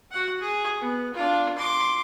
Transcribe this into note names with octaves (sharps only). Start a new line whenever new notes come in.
F#4 F#5
G#4
B3
D4 F4
C6 D6